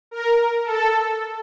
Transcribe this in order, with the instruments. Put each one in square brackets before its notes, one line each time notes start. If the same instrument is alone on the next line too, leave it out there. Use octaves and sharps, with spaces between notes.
[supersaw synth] A#4
A4